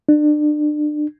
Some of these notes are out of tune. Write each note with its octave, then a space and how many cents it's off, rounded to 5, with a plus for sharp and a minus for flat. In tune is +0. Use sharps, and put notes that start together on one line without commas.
D4 +30